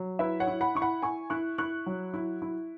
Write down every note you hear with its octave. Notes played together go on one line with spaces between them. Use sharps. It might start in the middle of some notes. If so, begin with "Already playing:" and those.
Already playing: F#3
E4 B4 E5
C#5 F#5
E4
F#5 B5
E4 C#6
F#5 B5
E4 G#5 C#6
E4 C#6 F#6
E4 C#6 F#6
F#3
E4
E4